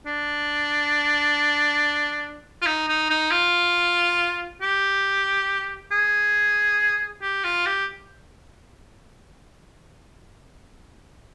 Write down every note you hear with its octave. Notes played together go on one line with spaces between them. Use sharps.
D4
F4
D#4
D#4
D#4
F4
G4
G#4
G4
F4
G4